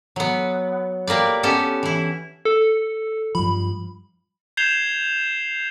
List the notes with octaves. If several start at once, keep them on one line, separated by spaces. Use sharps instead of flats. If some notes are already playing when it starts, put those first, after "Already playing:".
F#3 B3
G3 A#3 B4 D5
B3 C#4 G4 A4
E3 E4
A4
G2 F3 B5
G6 G#6 C7 E7 F7 G7